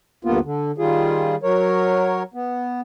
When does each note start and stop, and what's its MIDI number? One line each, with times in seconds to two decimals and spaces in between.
0.25 0.39 38
0.25 0.39 43
0.25 0.39 58
0.25 0.39 59
0.25 0.39 65
0.44 0.72 50
0.78 1.35 51
0.78 1.35 55
0.78 1.35 65
0.78 1.35 68
1.43 2.23 54
1.43 2.23 70
1.43 2.23 73
2.34 2.81 59